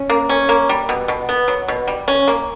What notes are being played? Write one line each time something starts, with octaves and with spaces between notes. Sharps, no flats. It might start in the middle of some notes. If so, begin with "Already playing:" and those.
Already playing: C#4
A#3
C#4
A#3
G3
B2
B2
B3
F#3
B2
G3
C#4
A#3